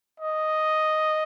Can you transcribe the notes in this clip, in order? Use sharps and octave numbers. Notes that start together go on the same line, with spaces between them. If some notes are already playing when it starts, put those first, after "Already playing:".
D#5